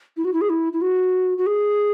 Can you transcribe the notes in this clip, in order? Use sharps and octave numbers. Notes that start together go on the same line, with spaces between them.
E4
F#4
E4
G#4
E4
E4
F#4
F#4
G#4